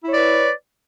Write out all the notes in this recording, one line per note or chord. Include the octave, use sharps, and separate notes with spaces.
E4 B4 C#5 D5